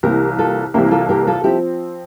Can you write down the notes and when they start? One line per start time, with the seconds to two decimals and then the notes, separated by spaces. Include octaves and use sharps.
0.03 C2 C3 E3 A#3 G4 A#4
0.39 F4 A4
0.74 C2 C3 E3 A#3 E4 G4
0.91 F4 A4
1.09 G4 A#4
1.27 F4 A4
1.44 F3 C4 E4 G4